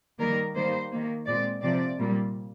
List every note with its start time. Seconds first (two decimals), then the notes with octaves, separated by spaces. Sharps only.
0.19 D#3 G3 A#3 A#4
0.55 D#3 G3 A#3 C5
0.90 D#3 A#3
1.26 A#2 G#3 C4 D5
1.62 C3 F3 C4 D5
1.98 A#2 G3 A#3